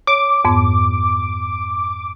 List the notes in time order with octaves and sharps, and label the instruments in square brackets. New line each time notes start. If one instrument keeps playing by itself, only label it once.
[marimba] C#5 [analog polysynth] D6
[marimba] F2 G#2 B3